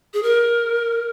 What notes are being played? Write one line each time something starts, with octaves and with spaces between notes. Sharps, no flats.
G#4
A#4